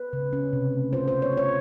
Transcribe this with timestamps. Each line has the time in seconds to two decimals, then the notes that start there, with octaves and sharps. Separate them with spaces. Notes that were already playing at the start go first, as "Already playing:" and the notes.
Already playing: B4
0.13 C#3
0.33 C#4
0.53 C3
0.73 A3
0.93 F4 C5
1.08 B3 C5
1.22 C#5
1.32 F4
1.37 C#5